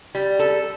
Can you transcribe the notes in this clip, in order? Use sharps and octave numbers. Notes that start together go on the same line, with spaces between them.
G3
A4